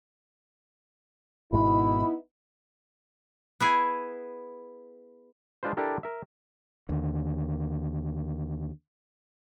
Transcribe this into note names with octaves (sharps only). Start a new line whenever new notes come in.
G#1 G#2 B2 B3 D#4 E4 B5
B3 E4 G#4
G#3 D4 F4 B4 C5
D4 E4 G4 A4 A#4
A#4 E5
D#2 D3